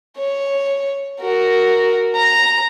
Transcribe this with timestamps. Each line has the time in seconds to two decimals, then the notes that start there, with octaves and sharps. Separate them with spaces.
0.18 C#5
1.21 F#4 A#4
2.15 A#5